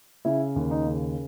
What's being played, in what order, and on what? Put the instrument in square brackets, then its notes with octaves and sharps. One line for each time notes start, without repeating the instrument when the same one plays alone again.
[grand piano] C#3 E4
D#2
D#4
C#3